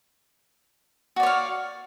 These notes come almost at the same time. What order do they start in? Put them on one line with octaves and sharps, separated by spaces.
F#4 D5 C#5 F5